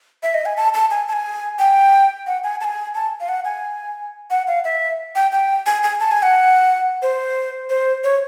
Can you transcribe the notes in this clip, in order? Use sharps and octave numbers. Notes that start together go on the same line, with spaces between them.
E5
D#5
G#5
A5
A5
G#5
A5
G#5
G5
F#5
G#5
A5
G#5
A5
F5
F#5
G#5
F#5
F5
E5
G5
G5
G#5
G#5
A5
G#5
F#5
C5
C5
C#5